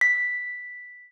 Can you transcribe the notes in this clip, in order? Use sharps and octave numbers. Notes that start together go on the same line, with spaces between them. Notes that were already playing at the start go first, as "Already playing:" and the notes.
B6